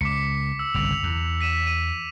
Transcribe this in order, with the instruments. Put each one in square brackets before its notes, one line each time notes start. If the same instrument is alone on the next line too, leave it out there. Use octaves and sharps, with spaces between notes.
[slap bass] C#2 [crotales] D6 B6 C#7
[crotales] E6
[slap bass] G1 C2 C#3 [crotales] F7
[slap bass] E2
[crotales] B6 D#7 E7
D#7